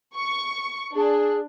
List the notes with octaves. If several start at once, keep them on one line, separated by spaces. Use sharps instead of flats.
C#6
D4 G#4